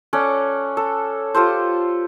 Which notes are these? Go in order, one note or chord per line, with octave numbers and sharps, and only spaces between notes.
C#4 A4 D5 F#5
A4
F4 G4 A4 C5